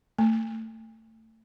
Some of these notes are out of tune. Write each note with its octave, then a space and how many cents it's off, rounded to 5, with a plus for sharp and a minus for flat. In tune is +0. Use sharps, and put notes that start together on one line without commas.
A3 +25